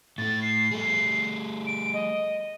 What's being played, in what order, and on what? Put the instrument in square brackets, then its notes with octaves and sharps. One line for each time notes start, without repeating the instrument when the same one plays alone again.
[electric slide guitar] A2 A3 [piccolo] A6
[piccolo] C7
[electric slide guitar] G3 A3 G#4
[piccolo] D7
D#5